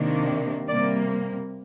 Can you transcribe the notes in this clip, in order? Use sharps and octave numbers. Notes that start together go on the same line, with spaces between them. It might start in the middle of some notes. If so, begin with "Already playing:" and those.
Already playing: C3 D#3 A#3 D4
C3 G3 A#3 D5